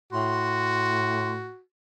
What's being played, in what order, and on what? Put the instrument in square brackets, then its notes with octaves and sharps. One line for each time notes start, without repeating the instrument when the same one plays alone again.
[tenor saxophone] A2 [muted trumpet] F#4 [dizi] C6